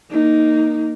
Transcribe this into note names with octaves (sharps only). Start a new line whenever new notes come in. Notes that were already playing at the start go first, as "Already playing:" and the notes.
A#3 D#4